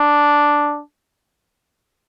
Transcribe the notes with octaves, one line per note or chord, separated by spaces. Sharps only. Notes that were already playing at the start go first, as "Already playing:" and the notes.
Already playing: D4